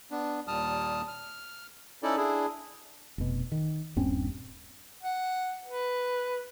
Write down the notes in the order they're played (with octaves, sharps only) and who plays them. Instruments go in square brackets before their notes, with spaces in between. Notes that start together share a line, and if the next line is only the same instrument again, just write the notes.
[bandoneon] B3 D4
D#2 A#2 G3 A5 D#6 F6
F6
C#4 D#4 E4 A4 D5
D4 E4 G#4
[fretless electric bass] F1 B2
D#3
D#1 G2 C4 C#4
[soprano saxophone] F#5
B4